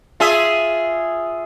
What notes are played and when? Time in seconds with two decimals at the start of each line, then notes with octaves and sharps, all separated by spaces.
0.20 F4 G#4 E5